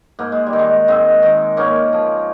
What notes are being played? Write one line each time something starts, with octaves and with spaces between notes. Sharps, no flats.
G#2 A#3
G#3
G3
D#3
G#3
G#2 G#3 C4
D#3
G#2 A#3 C#4
F3